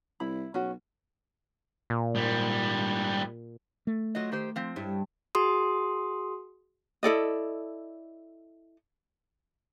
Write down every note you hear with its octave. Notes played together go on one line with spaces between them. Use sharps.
C2 E4 B5
B1 C#4 F#4
A#2
G#2 G3
A3
F#3 F4 D#5
D#3 G4 C5
F3 C4
G2 E4
F#4 G#4 C6 D#6
E4 A4 D5 D#5